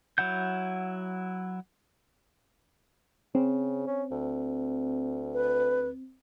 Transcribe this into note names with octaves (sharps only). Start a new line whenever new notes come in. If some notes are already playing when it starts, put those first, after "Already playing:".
F#3 E4 F#5 G6
C#3 C4
C#4
D2
B4